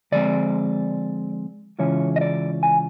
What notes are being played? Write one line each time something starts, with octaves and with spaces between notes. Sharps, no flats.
D3 F3 G#3 C4 D5
C#3 E3 G#3 C#4 F4 C#5
D#5
D5
G#5